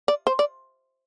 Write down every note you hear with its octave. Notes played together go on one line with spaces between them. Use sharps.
D5
C5
D5